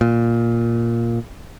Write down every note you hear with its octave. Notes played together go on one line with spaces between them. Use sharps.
A#2